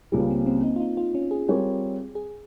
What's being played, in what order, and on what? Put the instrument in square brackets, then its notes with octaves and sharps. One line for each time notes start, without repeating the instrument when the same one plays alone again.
[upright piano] C#2 C#3 G3 [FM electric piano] A#3
[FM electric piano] C4
C4
D#4
F4
D#4
F4
C#4
G#4
[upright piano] G3 C4 F4 A#4 C#5 [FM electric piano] G#4
[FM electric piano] G#4